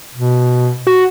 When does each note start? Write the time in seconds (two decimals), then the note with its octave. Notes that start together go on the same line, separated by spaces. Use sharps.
0.15 B2
0.87 F#4